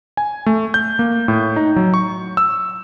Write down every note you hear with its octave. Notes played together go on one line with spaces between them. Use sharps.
G#5
A3
G6
A#3
A2
D#4
F#3
C#6
E6